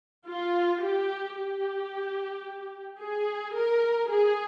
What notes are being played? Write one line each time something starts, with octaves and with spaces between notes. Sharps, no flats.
F4
G4
G4
G#4
A#4
G#4